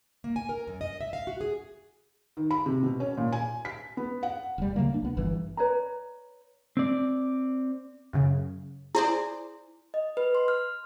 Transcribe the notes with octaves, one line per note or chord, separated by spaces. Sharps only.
A#3
G#5
A#4
F#2
D#5
E5
F5
F#4
G#4
D#3
B5
C3
B2
C#4
A#2
G#5
B6
B3
F#5
E1 G3
C#3 F#3 A3 A#3
A#3 D4
C2 B3
G1 G2 E3
B4 C#5 D5 A#5
C4 D5
F#2 C#3
E4 G#4 C5 D5
D#5
B4
C6
F6